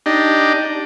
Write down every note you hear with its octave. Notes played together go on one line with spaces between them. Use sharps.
D4 D#4 G4